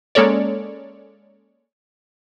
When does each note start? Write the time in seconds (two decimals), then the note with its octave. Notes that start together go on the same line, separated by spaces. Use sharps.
0.15 G#3 A#3 C#4 A4 C#5 D5